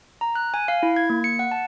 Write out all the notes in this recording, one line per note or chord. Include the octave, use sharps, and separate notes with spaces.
A#5
F#6
G#5
F5
E4
G#6
A#3
C#7
F#5
A5